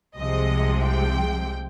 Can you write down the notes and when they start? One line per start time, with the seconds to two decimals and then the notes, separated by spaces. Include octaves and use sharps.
0.17 C2 C3 F3 G#3 D#5
0.83 G5